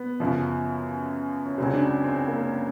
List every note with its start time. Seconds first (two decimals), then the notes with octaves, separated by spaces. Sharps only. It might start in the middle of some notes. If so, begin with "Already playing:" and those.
Already playing: B3
0.20 F#2 C#3 F3
1.46 C#4
1.58 C#2 C#3 F#3 C4
1.74 D4
1.81 C#4
2.04 C4
2.27 A#3